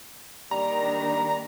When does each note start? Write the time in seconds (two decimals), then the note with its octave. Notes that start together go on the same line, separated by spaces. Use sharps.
0.51 D#3 G3 A#3 D4 A#5